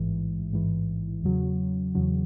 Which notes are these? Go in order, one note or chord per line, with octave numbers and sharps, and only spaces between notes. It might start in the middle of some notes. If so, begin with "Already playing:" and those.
Already playing: A1 G#2 E3
A1 G#2 E3
E2 C#3 F#3
E2 C#3 F#3